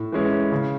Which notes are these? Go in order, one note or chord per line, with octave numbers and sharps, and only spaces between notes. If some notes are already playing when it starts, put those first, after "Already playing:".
Already playing: A2
E3 G#3 C#4 E4
C#3